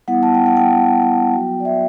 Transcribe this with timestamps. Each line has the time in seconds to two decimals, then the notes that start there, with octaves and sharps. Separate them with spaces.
0.08 G3 B3 E4 F#5
0.23 A5
0.35 G5
0.46 F#5
0.57 G5
1.02 G5
1.33 F#3 B3 F#4
1.60 D5
1.65 E5